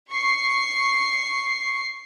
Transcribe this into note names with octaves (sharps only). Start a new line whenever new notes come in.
C#6 C7